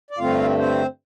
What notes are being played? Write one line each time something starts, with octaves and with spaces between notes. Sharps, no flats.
D5
G2 D3 A3 C4 F4 F5
C4 C5